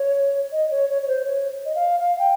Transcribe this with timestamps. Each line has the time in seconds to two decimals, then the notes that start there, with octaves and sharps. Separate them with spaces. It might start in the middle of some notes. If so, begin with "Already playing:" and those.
Already playing: C#5
0.52 D#5
0.71 C#5
0.89 C#5
1.02 C#5
1.08 C5
1.26 C#5
1.66 D#5
1.75 F5
2.00 F5
2.19 G5